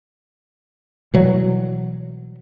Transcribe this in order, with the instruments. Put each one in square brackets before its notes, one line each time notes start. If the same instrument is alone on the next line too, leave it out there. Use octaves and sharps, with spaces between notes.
[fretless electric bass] B2 E3 F#3 G3